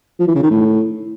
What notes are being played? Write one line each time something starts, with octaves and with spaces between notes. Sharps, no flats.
F3
E3
C#3
D#3
A2